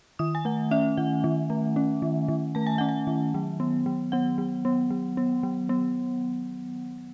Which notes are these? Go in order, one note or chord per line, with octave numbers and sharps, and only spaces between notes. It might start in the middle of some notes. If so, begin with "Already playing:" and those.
D#3 D#6
G#5
A3 F#5
C#4 E5
D#3 F#5
D#3
A3
C#4
D#3
D#3
A3 A5
G#5
C#4 F#5
G#5
D#3
F#3
B3
F#3
B3 F#5
F#3
B3
F#3
B3
F#3
B3